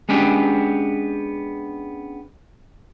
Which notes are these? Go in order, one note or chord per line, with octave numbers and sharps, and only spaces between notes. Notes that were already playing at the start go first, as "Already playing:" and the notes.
G#3 B3 C#4 D4 G4